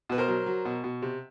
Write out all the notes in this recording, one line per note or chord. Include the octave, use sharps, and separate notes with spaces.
B2 B4
A#4 C5
F#3
F#3
B2
B2
C3